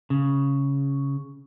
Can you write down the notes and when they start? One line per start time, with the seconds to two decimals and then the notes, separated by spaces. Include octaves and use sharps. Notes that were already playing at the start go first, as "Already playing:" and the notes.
0.10 C#3